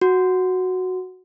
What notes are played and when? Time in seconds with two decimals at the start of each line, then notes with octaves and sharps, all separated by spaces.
0.02 F#4